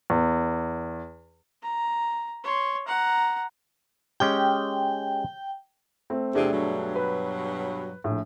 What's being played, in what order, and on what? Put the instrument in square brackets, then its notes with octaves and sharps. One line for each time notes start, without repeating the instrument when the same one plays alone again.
[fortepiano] E2
[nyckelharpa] A#5
C#5 C6
F#5 A#5
[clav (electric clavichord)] G#3 C#4 G4 [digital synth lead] G5
[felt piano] A3 C4
[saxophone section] E2 C3 [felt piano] A3 D4 G#4
[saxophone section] G2 B2 F#3
[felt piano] B4
A#1 A2